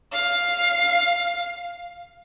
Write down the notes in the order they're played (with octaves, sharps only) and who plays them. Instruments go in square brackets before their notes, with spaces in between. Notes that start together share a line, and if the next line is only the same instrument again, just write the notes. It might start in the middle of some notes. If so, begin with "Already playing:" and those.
[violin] F5 C7